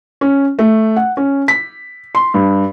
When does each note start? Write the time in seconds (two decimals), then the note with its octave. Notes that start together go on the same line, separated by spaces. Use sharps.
0.21 C#4
0.59 A3
0.96 F#5
1.17 C#4
1.48 B6
2.15 C6
2.34 G2